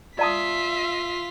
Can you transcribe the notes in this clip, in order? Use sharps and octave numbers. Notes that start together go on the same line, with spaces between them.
F4 D5 E5 A5 D#6 B6